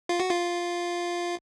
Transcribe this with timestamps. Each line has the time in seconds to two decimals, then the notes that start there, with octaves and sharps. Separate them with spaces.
0.09 F4
0.20 F#4
0.30 F4